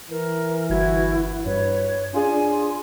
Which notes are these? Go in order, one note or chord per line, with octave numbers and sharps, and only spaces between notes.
E3 A#4
G1 E4 F#4 G#6
G2 B4 C#5
D4 F4 G#4 D5 G#5 C6